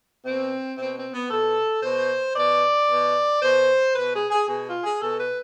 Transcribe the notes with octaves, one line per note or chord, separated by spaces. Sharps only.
B2 C4
B2 C4
C4
B3
B2 A4
B2 C5
B2 D5
B2
B2 C5
B2 B4
G#4
G#4
B2 G#4
F4
G#4
B2 A4
B4